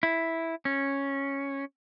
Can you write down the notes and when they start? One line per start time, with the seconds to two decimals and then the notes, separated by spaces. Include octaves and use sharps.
0.03 E4
0.65 C#4